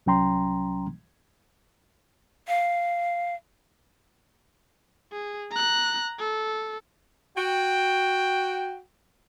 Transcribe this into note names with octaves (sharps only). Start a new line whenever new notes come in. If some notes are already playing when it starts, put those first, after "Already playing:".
C2 F#3 C#4 G5 A#5 C6
F5
G#4
A#5 F#6
A4
F#4 G5